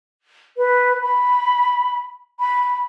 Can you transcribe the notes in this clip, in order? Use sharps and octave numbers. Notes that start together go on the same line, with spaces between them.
B4
B5
B5